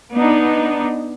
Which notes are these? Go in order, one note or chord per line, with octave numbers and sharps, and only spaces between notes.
B3 D4 D#4